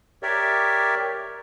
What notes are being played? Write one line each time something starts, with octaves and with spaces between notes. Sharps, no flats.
G4 A#4 C#5 D5 E5